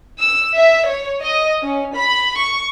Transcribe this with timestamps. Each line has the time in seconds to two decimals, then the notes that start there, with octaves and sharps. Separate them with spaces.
0.19 E6
0.56 E5
0.87 C#5
1.22 D#5
1.62 C#4
1.95 B5
2.37 C#6